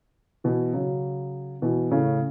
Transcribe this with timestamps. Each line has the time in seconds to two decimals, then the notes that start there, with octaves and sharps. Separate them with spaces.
0.44 B2 E3
0.73 C#3 F#3
1.62 B2 E3
1.91 A2 C#3